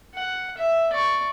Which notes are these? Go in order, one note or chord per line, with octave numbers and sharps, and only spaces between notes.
F#5
E5
D5 C#6